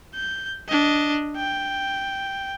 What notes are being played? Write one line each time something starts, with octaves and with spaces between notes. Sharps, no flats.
G6
D4 D#5
G5